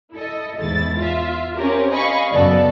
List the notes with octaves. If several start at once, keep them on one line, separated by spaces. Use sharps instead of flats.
E4 A4 D#5
E2 G#2 E4 A6
F4 E5
C4 C#4 G4 A#4
D#5 F5 G#5 B5 C#6
F#2 C#3 B3 A4 D5